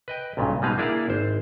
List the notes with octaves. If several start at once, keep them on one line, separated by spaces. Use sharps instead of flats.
B4 D#5 G5
B1 G2 A#2 C#3
B2 G3 G#3 D#4 B4 F5
A#3 D4 E4 G#4 D5 F5
G#1 C5